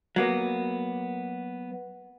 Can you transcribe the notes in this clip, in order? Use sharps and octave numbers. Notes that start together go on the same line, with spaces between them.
F#3 A#3 B3